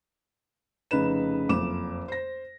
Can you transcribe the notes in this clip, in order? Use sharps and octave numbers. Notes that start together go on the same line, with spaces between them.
F1 C#3 D#4 B4 E7
F#1 F2 D6 E7
C5 A#6